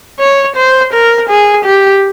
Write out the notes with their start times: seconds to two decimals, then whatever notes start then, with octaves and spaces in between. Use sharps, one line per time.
0.20 C#5
0.56 C5
0.93 A#4
1.29 G#4
1.65 G4